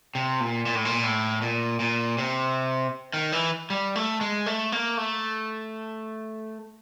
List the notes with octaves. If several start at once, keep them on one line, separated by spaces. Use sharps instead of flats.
C3
A#2
A#2
A2
A#2
A2
A#2
A#2
C3
D#3
E3
G3
A3
G#3
A3
A#3
A3